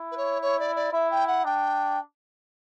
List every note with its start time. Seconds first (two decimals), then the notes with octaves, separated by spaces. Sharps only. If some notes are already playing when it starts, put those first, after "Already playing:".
Already playing: E4
0.11 B4
0.17 C#5
0.41 C#5
0.59 D5
0.75 D5
0.93 E4 E5
1.10 G5
1.27 F#5
1.45 D4 G5